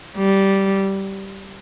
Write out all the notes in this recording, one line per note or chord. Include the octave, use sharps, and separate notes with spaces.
G3